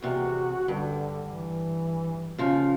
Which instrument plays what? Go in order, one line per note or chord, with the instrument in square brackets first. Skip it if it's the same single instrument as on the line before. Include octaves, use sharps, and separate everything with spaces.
[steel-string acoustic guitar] E2 C3 [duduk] F#4
[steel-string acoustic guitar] G2 [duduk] D3
[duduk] E3
[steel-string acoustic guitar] C#3 F3 [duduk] F4